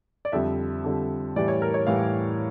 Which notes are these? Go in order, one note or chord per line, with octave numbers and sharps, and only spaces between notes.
D5
F2 D3 G3 E5
F2 D3 G3
A2 E3 G3 D5
C#5
A#4
C#5
A2 E3 G3 F5